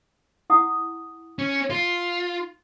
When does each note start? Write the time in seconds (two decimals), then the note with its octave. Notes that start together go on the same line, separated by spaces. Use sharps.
0.50 E4 F#5 D#6
1.39 C#4
1.70 F4